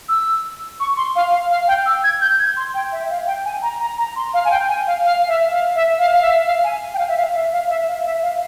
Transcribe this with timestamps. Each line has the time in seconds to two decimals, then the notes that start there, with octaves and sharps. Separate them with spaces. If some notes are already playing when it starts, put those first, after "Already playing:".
0.09 E6
0.80 C#6
0.97 C6
1.16 F5
1.32 F5
1.50 F5
1.68 G5
1.86 E6
2.04 G#6
2.21 G6
2.39 G#6
2.57 C6
2.74 G5
2.92 E5
3.10 F5
3.27 G5
3.45 G#5
3.62 A#5
3.80 A#5
3.98 A#5
4.16 C6
4.34 F5
4.45 G#5
4.51 G5
4.69 G#5
4.87 F5
5.05 F5
5.28 E5
5.51 F5
5.75 E5
5.99 F5
6.12 F5
6.22 E5
6.46 F5
6.64 G#5
6.94 G5
6.98 F5
7.08 E5
7.17 F5
7.35 E5
7.53 F5
7.69 E5
7.88 F5
8.05 E5
8.23 F5